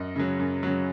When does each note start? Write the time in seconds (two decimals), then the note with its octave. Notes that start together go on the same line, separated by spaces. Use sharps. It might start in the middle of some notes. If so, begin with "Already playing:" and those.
Already playing: F#2 D#5
0.16 C#3 F#3
0.39 F#2
0.63 C#3 F#3